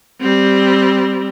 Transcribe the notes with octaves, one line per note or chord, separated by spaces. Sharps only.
G3 C4